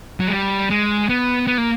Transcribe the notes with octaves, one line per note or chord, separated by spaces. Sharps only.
F#3
G#3
G3
G#3
B3
B3
A#3